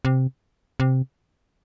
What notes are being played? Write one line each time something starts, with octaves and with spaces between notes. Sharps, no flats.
C3
C3